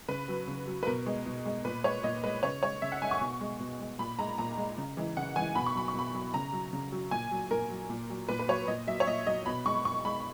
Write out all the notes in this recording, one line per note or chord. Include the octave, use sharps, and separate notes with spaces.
C#3 B4
F#3
C#3
F#3
B4
B2 A#4
G#3
B2
G#3
A#2 B4
G#3 C#5
A#2 D#5
G#3 B4
C#3 C#5
G#3 C#5
C#3 E5
F#5
G#3 G#5
C#6
B2
G#3
B2
G#3
A#2 B5
G#3 A#5
A#2 A#5
G#3
C#3
E3 G#3
C#3 F#5
E3 G#3 G#5
B2 B5
C#6
F#3 B5
C#6
B2 B5
F#3
C#3 A#5
F#3
C#3
F#3
A#2 G#5
F#3
A#2 A#4
F#3
A#2
F#3
A#2 B4
B4
F#3 C#5
A#2 D#5
F#3 E5
C#5
A#2 D#5
F#3 D#5
B2 B5
G#3 C#6
B2 C#6
G#3 B5